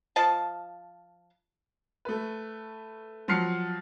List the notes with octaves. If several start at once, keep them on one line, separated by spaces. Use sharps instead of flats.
F3 D#5 A5
A3 B4
F3 F#3 C6 F6 C7 C#7